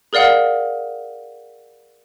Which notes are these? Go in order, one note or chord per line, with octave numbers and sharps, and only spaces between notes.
G#4 A#4 D5 F5 F#5